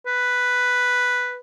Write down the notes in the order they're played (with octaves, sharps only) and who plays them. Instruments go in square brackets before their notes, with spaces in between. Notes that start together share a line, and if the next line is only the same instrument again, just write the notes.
[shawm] B4